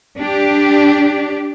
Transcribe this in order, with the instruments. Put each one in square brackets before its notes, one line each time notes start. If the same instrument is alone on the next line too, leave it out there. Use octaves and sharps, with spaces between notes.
[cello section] D4 G4